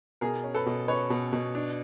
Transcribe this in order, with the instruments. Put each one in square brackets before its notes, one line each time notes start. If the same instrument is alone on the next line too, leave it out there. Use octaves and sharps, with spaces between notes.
[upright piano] B2 G#4 A#4
C#4
A4 B4
B2
C#4 B4 C#5
B2
B2
D4